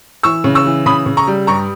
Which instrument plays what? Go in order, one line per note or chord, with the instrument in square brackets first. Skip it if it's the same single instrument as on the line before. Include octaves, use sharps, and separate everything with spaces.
[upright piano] E3 C#6 E6
C#3
C#6 E6
E3
C#3 B5 D#6
C#3
A#5 C#6
G3
G2 A#5 C#6